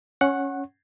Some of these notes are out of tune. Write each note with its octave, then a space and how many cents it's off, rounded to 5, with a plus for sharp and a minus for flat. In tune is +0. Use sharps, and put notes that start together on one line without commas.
C#4 +0 F#5 +0 C#6 -30